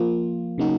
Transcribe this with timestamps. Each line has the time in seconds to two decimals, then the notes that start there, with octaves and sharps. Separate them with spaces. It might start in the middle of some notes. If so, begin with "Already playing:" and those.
Already playing: F3 A#3 F4
0.58 C#3 F#3 A#3 D#4 F#4